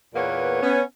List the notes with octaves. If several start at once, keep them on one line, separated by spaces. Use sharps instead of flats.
E2 A#2 A#3 B3 B4 C#5
B3 C#4